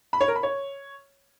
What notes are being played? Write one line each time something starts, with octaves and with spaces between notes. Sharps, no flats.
B5
C#5
A#4
B5
C#5